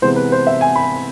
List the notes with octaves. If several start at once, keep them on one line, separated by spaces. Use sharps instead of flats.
C3 E3 G#3 B3 C5
B4
C5
E5
G#5
B5